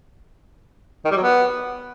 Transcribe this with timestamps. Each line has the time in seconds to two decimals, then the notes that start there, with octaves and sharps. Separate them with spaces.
1.05 D#3
1.11 G3
1.17 F#3
1.23 B3